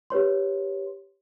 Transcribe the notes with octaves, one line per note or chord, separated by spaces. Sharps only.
G4 B4 C#5 C6